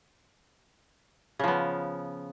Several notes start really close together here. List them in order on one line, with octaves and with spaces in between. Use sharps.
C#3 F3 B3